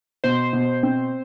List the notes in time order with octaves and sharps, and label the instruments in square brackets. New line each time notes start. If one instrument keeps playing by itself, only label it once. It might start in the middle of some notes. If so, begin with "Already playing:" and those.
[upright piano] B2 [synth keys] C5
[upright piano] B2
C4